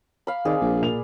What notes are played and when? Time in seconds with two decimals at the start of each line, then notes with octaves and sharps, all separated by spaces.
0.27 F5 B5
0.45 D#3 C4 G#4 D5
0.61 A#1
0.82 A#2 F5 F7